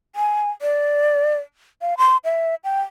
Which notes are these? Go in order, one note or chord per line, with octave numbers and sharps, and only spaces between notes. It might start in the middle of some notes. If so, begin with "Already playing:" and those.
G#5
D5
F5
C6
E5
G5